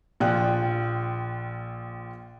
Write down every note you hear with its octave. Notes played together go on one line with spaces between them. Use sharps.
A#1 F4 G5 F#6